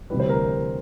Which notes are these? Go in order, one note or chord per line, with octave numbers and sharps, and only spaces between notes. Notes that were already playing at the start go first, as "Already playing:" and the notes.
D2 C3 E3 G3 B4
C5
A#4